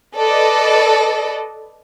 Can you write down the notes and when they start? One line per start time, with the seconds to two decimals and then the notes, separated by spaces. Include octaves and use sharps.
0.16 A4 B4 D5 D#5